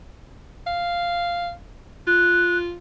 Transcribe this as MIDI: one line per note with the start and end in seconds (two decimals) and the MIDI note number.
0.67 1.51 77
2.07 2.75 65
2.07 2.58 90